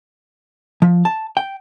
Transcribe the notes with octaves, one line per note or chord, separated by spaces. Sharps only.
F3
A5
G5